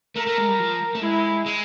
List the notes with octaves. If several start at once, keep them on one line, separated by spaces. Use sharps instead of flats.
A3 A#4
A3
G#3
G3
F3
A3
G#3 E4
G#3